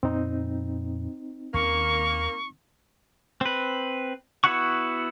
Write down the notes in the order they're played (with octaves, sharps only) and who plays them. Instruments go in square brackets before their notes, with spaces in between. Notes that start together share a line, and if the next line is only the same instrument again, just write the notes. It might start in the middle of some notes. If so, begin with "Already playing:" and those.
[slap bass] F2 A#2 B3 [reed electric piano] C4 D#4
[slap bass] D#2 D#3 C#4 [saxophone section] A#3 [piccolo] C#6
[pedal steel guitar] C4 B4
B3 E4 F#4 F#5 C#6